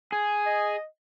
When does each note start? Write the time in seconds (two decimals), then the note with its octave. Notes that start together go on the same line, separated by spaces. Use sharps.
0.12 G#4 G#5
0.46 D#5